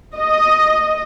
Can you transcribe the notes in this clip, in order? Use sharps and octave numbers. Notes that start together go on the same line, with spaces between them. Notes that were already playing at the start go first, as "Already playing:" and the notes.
D#5